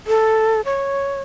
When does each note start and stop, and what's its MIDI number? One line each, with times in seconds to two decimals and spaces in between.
0.07 0.61 69
0.65 1.22 73